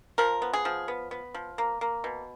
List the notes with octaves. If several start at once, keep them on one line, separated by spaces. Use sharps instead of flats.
F3 A#4
B3
G#4
F3
B3
B3
F3
A#3
A#3
B2